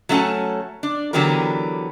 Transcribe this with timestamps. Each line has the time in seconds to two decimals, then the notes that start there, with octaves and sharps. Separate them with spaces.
0.09 F#3 A3 C#4 F#4 G#5 A5
0.83 D4
1.13 D3 E3 F#3 B3 G4 A#4